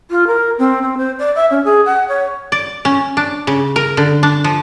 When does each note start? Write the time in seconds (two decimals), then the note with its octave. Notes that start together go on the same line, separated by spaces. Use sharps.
0.10 F4
0.27 A#4
0.59 C4
0.82 C4
0.98 C5
1.19 D5
1.36 E5
1.51 C#4
1.65 G#4
1.86 F#5
2.09 C#5
2.52 D5
2.85 C#4
3.17 D4
3.47 C#3
3.76 A#4
3.97 D3
4.23 D4
4.44 F3